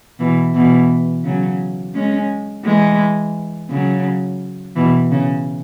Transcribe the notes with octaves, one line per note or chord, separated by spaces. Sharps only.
B2 E3
B2 E3
C#3 F#3
G#3 C#4
E3 G#3
C#3 F#3
B2 E3
C#3